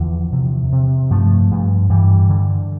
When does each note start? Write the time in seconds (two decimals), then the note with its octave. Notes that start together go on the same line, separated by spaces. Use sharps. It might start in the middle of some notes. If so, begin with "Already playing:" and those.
Already playing: E2 D3 F3
0.32 C3
0.72 C3
1.10 G2 F3 A3
1.51 G2
1.89 G2 E3 G3
2.29 D3